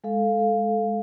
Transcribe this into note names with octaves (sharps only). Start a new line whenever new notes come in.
G#3 A4 F5